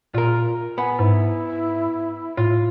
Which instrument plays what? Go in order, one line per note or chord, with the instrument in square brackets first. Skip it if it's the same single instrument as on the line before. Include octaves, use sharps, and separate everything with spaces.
[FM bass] A#2 [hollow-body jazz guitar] F4 A#4
[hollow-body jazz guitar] B3 [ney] G#5
[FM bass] G#2 [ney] E4
[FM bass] A2 [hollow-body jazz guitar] F4